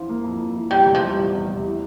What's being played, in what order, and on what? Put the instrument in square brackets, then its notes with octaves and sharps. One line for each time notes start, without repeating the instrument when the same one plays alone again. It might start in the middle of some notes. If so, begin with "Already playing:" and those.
Already playing: [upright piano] F2 E3 [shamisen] F3
[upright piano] A#3
F2
F2
E3
[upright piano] E2 [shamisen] G3
[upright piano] C3
[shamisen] F3
[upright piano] G3
E2
E2
C3
E3